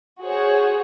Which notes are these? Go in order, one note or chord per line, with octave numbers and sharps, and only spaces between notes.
F#4 G#4 C5 C#5